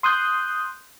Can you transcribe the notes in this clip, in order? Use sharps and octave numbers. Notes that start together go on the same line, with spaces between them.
C6 D#6 F#6 G6